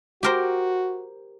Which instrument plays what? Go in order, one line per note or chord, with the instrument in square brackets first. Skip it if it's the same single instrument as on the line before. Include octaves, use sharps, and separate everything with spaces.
[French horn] F#4 [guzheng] G4 A#4 C5